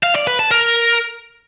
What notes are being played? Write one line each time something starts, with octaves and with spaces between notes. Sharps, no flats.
F5
D5
B4
A5
A#4